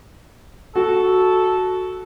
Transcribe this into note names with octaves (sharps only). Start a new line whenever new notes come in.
F#4 A4